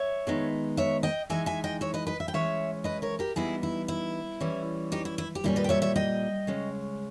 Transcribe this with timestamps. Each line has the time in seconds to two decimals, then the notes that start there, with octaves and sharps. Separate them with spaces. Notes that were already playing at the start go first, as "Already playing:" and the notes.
Already playing: C#5 E5
0.27 D#3 G#3 B3 D#4
0.77 C#5 E5
1.03 D#5 G5
1.30 E3 G#3 D#4 E5 G#5
1.46 E5 G#5
1.64 D#5 G5
1.81 C#5 E5
1.94 B4 D#5
2.07 B4 D#5
2.20 E5
2.28 G5
2.34 E3 G#3 C#4 C#5 E5
2.84 B4 D#5
3.02 A#4 C#5
3.19 G4 A#4
3.36 E3 G3 B3 D#4 E4 G#4
3.63 E4
3.88 E4
4.40 E3 G3 C#4
4.92 D#4 G4
5.05 E4
5.18 E4
5.35 G4
5.44 A#2 G3 C#4 E4
5.56 B4 D#5
5.64 G5
5.69 C#5 E5
5.82 C#5 E5
5.96 D#5 G5
6.47 C#3 G#3 C#4